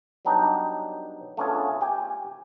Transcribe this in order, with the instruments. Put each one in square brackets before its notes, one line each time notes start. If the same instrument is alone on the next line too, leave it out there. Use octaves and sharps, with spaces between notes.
[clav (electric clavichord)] F#3 G3 B3 D4 D#4 G4
A3 B3 C#4 D4 F4 G#4
G4 G5 G#5